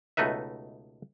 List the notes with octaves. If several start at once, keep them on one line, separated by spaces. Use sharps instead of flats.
C#2 B2 A3 D#4 B4 E5